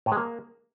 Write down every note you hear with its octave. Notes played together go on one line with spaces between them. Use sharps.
A2
G#3
A#3